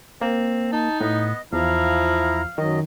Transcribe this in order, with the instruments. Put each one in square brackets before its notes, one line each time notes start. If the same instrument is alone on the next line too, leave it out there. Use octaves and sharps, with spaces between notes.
[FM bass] A#3 [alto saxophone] C4
[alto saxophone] D#4 [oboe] A5
[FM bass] A2 [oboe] B3 [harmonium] D#5
[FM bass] E2 [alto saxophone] F3 [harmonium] E4 A#5 [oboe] F5
[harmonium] F#2 F#3 D#5 [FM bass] D#3